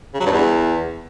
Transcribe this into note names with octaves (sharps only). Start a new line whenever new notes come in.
C#3
F#3
G2
E2